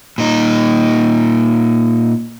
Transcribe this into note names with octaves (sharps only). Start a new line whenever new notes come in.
A#2 D#4